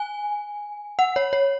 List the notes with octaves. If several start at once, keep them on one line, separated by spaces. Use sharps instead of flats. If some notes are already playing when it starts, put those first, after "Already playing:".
Already playing: G#5
F#5
C#5
C#5